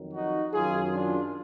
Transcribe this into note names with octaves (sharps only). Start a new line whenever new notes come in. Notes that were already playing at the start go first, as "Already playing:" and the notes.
Already playing: F2 D#3 F#3
D#4 F#4
F#2 D#3 F#3 F4 G#4
D4 F4